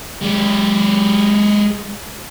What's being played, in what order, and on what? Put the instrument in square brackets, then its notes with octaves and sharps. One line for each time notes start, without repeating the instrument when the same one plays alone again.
[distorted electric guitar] G#3 G4